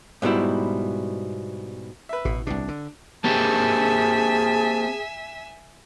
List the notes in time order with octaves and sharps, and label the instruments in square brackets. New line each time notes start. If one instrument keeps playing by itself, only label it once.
[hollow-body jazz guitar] G#2 B2 G3 E4
[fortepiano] B4 E5
[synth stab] A1 [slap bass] B2
[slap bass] C2 B2 [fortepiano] D4
[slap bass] D3
[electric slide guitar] A#3 C4 G4 [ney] G#4 [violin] E5 G#5 [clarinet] A5